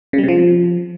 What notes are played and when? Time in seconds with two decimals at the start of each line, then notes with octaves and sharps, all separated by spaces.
0.13 C#3
0.18 G3
0.23 C3
0.28 F3